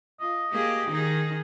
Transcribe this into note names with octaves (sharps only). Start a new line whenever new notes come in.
F4 D#5
A#3 G4 G#4
D#3 D#4 G#4